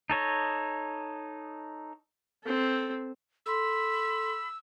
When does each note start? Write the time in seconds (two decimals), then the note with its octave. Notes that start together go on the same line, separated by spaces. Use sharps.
0.10 D#4 A4 C#5 D#5
2.44 C4 A4
3.46 A4 B5 C6 E6